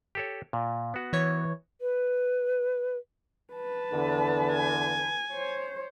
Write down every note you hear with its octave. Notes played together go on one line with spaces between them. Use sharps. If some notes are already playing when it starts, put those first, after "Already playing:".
G4 A4 C#5
A#2
B3 F#4
E3 C#5
B4
B4 A5
E2 D3
G#5
C5 C#5